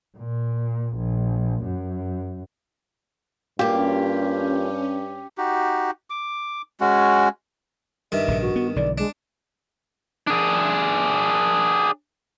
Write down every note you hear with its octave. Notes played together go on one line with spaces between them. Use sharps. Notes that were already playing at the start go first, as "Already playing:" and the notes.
A#2
A#1
F#2
G2 A#3 C#4 F4 G4
D#4 F#4 G4
D6
G#3 C#4 F#4
G2 D#3 E5
A#1 G#2 C#3
F#4
B3
B1 D3 E3 D5
G#3 D4
D4 G#4